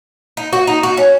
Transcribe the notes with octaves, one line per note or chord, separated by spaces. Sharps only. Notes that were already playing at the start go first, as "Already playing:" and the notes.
D#4
F#4
D#4
F#4
C#4